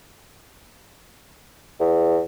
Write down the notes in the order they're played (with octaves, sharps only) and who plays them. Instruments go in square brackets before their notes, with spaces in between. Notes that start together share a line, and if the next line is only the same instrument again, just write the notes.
[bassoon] E2